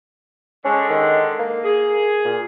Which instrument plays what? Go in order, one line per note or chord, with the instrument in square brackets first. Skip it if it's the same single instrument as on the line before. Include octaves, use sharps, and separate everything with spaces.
[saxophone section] D3 G#3 [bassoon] C#4
[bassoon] D#3
A#3
[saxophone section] G#4
[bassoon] A#2